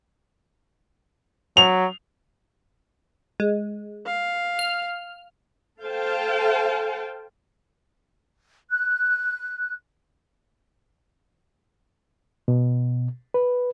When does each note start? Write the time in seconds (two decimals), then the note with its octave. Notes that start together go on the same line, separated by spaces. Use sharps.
1.57 F#3 F7
3.40 G#3
4.06 F5
4.59 F6
5.82 A4 C5 F5 G5 A5
8.70 F#6
12.48 B2
13.34 B4